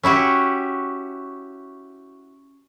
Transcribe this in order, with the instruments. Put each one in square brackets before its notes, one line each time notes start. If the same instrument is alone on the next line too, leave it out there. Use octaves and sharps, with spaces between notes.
[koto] C#4 E4 F#4 G4